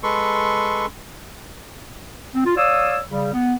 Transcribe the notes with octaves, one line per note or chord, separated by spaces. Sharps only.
G#3 A4 B4 C6 C#6
C4
F4
C#5 D5 F5 D#6 E6
C#3 G3
B3